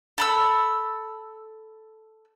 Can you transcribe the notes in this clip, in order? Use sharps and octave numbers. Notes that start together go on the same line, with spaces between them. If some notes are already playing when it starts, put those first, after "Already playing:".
A4 B5 E6